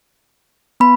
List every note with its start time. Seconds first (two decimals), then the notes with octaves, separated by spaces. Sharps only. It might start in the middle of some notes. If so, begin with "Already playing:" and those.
0.80 B3 B5